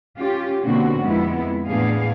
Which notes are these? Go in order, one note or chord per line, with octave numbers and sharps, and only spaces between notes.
C#4 F4 G4
B2 D3 A#3 C4 C#4 F#4
F2 G#3 B3 E4
E2 A2 B3 D4 G#4 F5